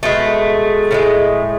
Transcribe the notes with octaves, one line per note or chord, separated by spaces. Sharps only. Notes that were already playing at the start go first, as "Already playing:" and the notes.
B2 G#3 A3
A2 F3 G#3